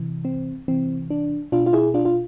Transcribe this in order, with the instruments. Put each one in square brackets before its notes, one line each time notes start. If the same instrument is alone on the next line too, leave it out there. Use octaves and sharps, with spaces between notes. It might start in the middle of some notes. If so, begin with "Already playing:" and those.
Already playing: [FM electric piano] C3 E3
C4
C3 E3 C4
D4
B2 D4 F4
F4
E4 G#4
D4 F4
F4